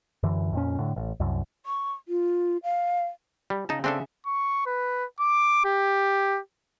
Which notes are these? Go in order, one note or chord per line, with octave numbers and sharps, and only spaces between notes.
F#2 D3 E3
F2 A#2 C#4
A2 D3
A1
C2 F#2
C#6
F4
F5
G3
C#3 D#4 A5
C#3 C4 D4 G#4 A4 E5
C#6
B4
D6
G4